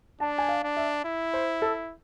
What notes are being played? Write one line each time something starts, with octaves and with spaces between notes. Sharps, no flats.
D4 A5
G#5
F5
D4
E5
E4
C5
A4